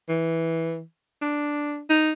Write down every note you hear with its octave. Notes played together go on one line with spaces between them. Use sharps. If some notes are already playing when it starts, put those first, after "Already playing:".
E3
D4
D#4